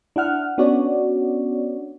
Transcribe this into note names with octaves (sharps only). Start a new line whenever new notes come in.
D4 E4 F#5 F6
B3 C#4 D4 F#4 C#5 D5